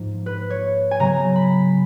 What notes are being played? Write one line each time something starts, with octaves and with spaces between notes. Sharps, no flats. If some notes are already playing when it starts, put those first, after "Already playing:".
Already playing: G#2 F3 A#3
B4
C#5
G#5
C#3 F#3 B3 A#5
B5